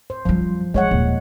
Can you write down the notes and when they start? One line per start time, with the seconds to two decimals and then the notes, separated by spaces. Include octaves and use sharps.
0.10 C5
0.25 F#2 F3 G3
0.74 E3 G3 G#3 C#5 F#5
0.91 D#1